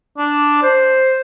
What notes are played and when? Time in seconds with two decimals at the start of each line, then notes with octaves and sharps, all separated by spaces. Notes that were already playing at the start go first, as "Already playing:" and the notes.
0.18 D4
0.63 C5